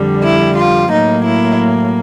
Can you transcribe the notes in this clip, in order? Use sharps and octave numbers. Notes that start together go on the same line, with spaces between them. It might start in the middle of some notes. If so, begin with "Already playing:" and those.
Already playing: F2 D3 G3
E4
F4
A2 F#3 A#3 D#4
E4